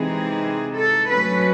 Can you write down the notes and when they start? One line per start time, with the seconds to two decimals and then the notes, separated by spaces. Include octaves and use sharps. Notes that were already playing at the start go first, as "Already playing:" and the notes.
Already playing: C3 E3 G#3 C4 D#4 G#4
0.75 A4
1.10 F#3 A3 C#4 B4